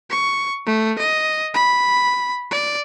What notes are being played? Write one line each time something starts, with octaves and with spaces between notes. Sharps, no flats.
C#6
A3
D#5
B5
D5